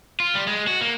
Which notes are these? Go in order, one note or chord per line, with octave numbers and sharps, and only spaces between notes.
F4
G3
G#3
F#4
A#3